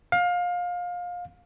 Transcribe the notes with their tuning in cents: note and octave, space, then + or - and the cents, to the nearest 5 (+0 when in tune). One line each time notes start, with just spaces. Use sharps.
F5 +25